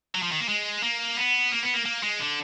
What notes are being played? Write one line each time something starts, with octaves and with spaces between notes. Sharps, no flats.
F#3
F3
D#3
A#3
G#3
A#3
B3
A#3
B3
A#3
A#3
G#3
D3